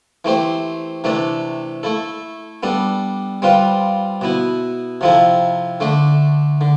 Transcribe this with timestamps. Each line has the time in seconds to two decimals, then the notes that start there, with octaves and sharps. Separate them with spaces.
0.25 E3 A3 C4 G4 C5
1.04 C3 E3 A3 D4 A4
1.83 A3 E4 A4
2.63 G3 B3 D4 A4
3.42 G3 C4 F4 B4
4.21 B2 B3 E4
5.01 C3 F3 C4 E4 A4
5.80 D3 A3 D4
6.61 D3